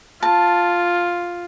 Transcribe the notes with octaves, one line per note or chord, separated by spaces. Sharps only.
F4 A5